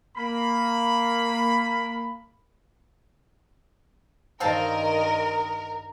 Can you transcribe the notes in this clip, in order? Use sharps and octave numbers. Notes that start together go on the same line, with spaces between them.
A#3 B5
G2 D#3 C4 A#4 D#5 F5 A5